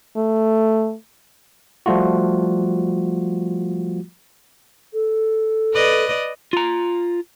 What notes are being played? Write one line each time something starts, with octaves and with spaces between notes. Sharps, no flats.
A3
F3 G3 A3 F4 F#4
A4
B4 D5 D#5
F4 A#5